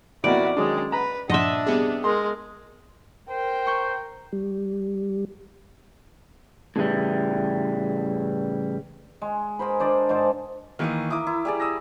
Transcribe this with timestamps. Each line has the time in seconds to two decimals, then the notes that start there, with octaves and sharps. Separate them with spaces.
0.24 F2 B2 A#3 E4 F#4 D5
0.57 D#3 F#3 G#3 C#4 D4
0.92 B4 A#5 B5
1.30 G2 A#2 F3 D4 D#5 E5 F#5 C6
1.66 C3 G3 B3 G#4
2.04 G#3 A#4 C6
3.30 A#4 C5 G5
3.66 A#5 C#6 G6
4.33 G3
6.76 A2 C#3 E3 G3
9.22 G#3
9.59 G#4 A#4 C5 B5
9.80 D4 C5 D5 D#5
10.09 G#2 G#3 C5 A5
10.79 D#3 E3 A#3 F5 C#6 D#6
11.10 E4 A#4 D6 D#6
11.27 E4
11.45 G3 G#4 D5
11.60 D#6 E6 A#6